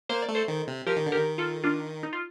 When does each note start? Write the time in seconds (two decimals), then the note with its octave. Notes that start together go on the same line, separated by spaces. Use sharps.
0.09 A#3 C5
0.22 D5
0.29 A3
0.35 A4 C5
0.48 D#3
0.68 C3
0.87 F3 G4 A#4
0.96 D#3
1.06 D3
1.12 D#3 G4 A#4
1.38 F4 A4
1.64 D4 F4
2.03 D#4
2.13 F4